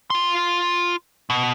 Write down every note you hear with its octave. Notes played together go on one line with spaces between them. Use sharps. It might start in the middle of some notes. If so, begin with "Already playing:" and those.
F4 C6
B2